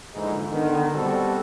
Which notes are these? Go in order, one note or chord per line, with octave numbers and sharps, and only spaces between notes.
A#1 G#2 D3 E3 G#3 D#4
D3 D#3 B3
B2 G3 C4 F#4 A4